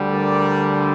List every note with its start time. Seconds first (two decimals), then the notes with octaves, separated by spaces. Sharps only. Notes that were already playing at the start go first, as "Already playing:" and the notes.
Already playing: D2 D3 G3
0.13 A#4 D5